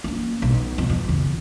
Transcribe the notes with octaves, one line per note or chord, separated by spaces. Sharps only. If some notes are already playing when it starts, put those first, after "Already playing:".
A#3 C#4
B1
F2
E2
E2 C#3